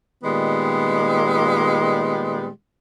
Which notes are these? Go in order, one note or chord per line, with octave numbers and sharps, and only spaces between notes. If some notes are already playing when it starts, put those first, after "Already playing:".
A#2 D#3 G3 G#3 B3